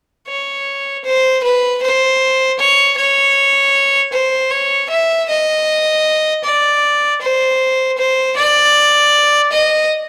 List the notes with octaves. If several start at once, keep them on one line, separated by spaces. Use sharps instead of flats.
C#5
C5
B4
C5
C#5
C#5
C5
C#5
E5
D#5
D5
C5
C5
D5
D#5